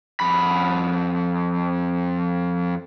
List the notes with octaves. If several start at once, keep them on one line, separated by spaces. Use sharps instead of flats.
F2 B5